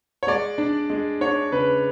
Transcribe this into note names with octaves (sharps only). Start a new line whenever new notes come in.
C#5
G#3 D5
D4
G#3
D4 C#5
C#3 B4